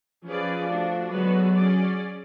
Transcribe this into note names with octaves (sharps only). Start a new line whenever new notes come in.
F3 C#4 G#4 B4 D5
A3 D4 F#4
D3 F#3 G#3 B3 F#4 B4
C#4 G#4 D5